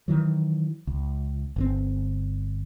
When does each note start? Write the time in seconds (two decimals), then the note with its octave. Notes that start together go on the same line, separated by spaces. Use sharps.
0.08 D#3 E3 F#3
0.87 C#2
1.56 G1 C3 C4